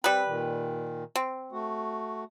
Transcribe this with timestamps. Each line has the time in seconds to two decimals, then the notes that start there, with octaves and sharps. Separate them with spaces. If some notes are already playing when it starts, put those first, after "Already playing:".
0.04 G3 C4 B4
0.27 A#2 D#3
1.16 C4
1.52 A3 F#4